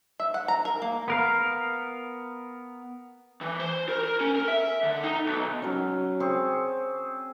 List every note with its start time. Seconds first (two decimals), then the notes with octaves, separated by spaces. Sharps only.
0.20 E5
0.34 F#5
0.48 A#5
0.65 A#4
0.82 A#3
1.08 B3 A#4 F5
3.41 E3
3.60 C5
3.89 A#4
4.04 A#4
4.20 C#4
4.36 A#4
4.48 E5
4.83 D3
5.03 D#4
5.26 B1
5.62 F#3 C#4
6.20 C4 G#4 C#6